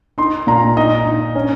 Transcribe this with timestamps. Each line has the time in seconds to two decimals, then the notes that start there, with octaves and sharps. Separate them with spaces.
0.18 D#4 C6
0.47 A#2 A#5
0.77 D#4 D#5
1.06 D#4
1.35 C#4